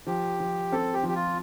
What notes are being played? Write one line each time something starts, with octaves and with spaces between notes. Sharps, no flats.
F3 G4
F3
C4 A4
G4
F3
G4
F4